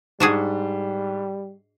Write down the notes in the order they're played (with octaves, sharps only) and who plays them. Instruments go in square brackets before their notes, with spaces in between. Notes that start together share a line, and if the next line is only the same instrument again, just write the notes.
[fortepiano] G#2 [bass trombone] G3 [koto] D4 F#4 G#4